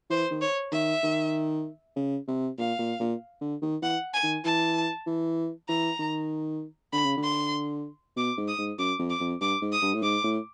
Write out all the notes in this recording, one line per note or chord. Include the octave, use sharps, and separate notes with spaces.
E3 C5
D#3
C#5
D#3 E5
D#3
C#3
C3
A#2 F5
A#2
A#2
D3
D#3
E3 F#5
G#5
D#3
E3 A5
E3
E3 A#5
D#3
D3 B5
C#3
D3
C6
B2 D6
G#2
D#6
G#2
F#2 D6
F2
D6
F2
G2 D6
G#2
D#6
G2
A2
G#2 D6
A2